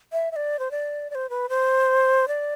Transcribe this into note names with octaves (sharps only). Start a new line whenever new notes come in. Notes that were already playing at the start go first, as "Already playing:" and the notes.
E5
E5
D5
C5
D5
D5
C5
B4
C5
D5